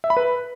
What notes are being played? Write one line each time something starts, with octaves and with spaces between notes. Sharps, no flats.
E5
B5
B4